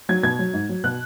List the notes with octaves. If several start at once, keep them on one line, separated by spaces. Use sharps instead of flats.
F#3 G#6
B2 G#6
F#3
G#2
F#3
B2 F#6